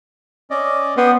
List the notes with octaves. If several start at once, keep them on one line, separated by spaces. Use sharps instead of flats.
C#4 D5 D#5
B3 G5 C6 D#6